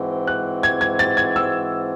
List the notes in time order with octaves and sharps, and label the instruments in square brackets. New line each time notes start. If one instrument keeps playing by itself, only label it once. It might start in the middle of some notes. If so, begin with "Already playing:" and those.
Already playing: [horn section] G#2 E3 C4 F#4
[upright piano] F#6
G#6
G#6
A6
G#6
E6